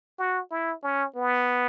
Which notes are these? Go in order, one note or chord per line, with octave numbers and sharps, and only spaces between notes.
F#4
E4
C#4
B3